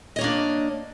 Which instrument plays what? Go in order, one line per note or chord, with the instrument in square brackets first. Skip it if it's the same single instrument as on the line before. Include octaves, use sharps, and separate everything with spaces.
[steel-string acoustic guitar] D#5
C#5
A#3
D4